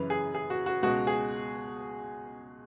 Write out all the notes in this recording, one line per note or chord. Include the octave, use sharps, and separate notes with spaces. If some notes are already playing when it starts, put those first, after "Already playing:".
Already playing: F#2 C#3 E3 B4
G#4
G#4
F#4
F#4
C#2 B2 G#3 F#4
G#4